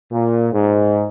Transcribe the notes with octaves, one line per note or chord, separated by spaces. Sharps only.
A#2
G#2